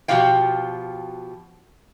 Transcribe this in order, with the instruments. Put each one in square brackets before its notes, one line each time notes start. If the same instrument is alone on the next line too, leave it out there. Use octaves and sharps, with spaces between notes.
[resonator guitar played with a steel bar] B2 F3 F#4 G4 F5 G5